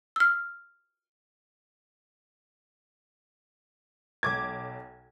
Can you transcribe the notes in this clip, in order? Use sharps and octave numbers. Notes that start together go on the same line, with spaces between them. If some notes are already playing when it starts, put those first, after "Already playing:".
E6 F6
B1 D6 G#6